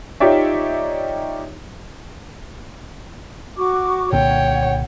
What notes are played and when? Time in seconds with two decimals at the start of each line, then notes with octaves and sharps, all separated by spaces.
0.20 D#4 F4 G4 C#5 D5 E5
3.57 F#4 C#6 D6
4.13 C2 A#2 D3 C#5 F#5 G5